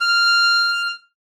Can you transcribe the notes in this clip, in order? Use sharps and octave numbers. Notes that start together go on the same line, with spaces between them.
F6